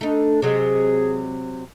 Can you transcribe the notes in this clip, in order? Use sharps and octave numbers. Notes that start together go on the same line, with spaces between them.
A3 D4 D#4
C3 F#3 G#3 G#4